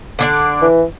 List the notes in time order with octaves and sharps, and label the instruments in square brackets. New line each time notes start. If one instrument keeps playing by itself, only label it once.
[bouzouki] D3 D4 D5
[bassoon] E3